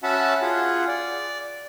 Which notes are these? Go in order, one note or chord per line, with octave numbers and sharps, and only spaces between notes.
C#4 F#4 E5 F#5 A5 B5
F4 G#4 F#5
D5